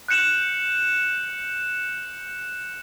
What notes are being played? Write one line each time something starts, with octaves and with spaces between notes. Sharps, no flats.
F#6 G6 C#7 E7 F#7